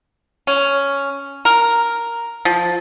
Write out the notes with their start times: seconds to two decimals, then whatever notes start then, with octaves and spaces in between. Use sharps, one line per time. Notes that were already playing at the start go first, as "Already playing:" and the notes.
0.47 C#4
1.45 A#4
2.45 F3